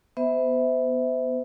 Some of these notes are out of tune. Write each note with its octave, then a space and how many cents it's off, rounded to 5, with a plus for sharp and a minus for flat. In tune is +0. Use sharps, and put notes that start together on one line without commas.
B3 +0 C5 -35 E5 -15